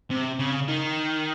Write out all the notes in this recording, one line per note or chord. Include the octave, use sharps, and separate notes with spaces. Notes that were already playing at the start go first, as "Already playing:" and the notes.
C3
C#3
D#3